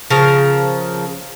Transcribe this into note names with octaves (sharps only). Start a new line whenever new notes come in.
C#3 F3 A#4